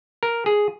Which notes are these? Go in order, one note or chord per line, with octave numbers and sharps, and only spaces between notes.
A#4
G#4